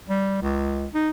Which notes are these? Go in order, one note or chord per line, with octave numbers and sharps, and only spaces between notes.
G3
C#2
D#4